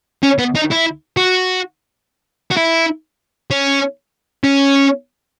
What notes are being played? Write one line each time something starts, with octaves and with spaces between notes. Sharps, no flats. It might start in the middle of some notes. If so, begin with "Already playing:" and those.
C#4
B3
D#4
E4
F#4
F#4
E4
C#4
C#4